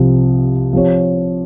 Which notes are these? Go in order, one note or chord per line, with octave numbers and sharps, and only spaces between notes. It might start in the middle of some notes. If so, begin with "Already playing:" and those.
Already playing: C2 C3 F3
F3 C4 G4 C#5